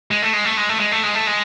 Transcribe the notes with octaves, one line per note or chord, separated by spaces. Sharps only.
G#3
A3
G#3
A3
G#3
A3
G#3
A3
G#3
A3
G#3